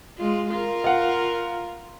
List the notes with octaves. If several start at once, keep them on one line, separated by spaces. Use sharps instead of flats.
G#3 F4
F4 A#4
F5 F#5